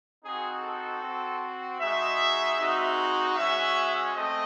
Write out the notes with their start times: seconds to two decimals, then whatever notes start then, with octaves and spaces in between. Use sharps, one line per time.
0.23 C4 D#4 F#4 G#4
0.62 A4
1.01 C4 F#4
1.80 G#3 D#4 F#4 E5
2.58 G#3 C4 D#4 F#4
3.36 G#3 C#4 F#4 E5
4.15 A3 C4 D#5